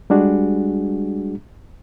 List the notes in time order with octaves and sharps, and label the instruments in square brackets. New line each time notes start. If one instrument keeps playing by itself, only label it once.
[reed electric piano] G3 G#3 D4 F#4 G#4